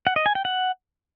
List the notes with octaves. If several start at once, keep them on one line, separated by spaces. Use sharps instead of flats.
F#5
D#5
G#5
G5
F#5